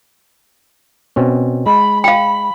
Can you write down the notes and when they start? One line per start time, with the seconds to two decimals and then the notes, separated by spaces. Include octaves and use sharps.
1.16 B2 C4 C#4
1.66 G#3 B5
2.04 F5 G5 B5